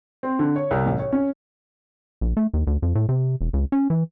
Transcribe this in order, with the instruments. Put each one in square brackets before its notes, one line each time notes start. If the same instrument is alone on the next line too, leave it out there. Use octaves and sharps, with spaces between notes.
[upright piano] C4
D3
C#5
C2
A1
C#5
C#4
[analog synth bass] A#1
A3
D#2
D2
F2
A2
C3
E1
C#2
C#4
E3